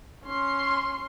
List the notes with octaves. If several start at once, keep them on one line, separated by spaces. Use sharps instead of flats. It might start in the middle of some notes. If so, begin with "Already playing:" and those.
C#4 C6